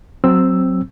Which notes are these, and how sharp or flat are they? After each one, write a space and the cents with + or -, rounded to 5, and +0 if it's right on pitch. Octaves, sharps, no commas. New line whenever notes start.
F#3 +0 C4 +0 E6 +0